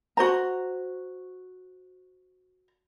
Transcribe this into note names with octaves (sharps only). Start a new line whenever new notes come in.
F#4 C5 A#5